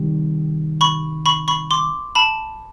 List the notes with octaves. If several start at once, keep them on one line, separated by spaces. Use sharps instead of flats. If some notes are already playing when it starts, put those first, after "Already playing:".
Already playing: C3 D#3 G3
B5 C#6
B5 C#6
B5 C#6
C6 D6
A5 B5